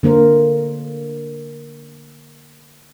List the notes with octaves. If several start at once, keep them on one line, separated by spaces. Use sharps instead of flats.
D3 A#3 A#4 C5